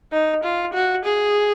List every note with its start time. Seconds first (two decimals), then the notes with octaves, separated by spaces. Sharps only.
0.12 D#4
0.43 F4
0.73 F#4
1.05 G#4